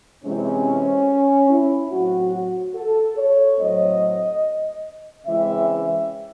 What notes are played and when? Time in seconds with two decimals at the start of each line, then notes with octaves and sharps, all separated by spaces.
0.23 C3 E3 G#3 C4 C#4
1.49 E4
1.90 A2 F#3 C4 F#4
2.32 F#4
2.74 A4
3.17 C#5
3.57 A2 F#3 A3 C4 D#5
5.25 C#3 E3 G#3 C4 E5
5.67 E5